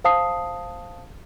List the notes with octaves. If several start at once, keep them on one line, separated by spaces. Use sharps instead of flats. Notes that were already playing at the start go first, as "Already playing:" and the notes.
C5 F5 A5 D#6 C7